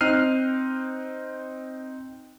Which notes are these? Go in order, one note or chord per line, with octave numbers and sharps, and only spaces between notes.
C4 D#4 F6 F#6 C7 D#7